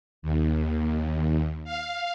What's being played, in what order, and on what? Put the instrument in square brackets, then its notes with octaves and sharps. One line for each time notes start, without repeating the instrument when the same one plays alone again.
[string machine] D#2
F5